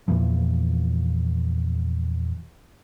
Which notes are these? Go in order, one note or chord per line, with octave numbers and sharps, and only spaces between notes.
E2 A#2 E3 F3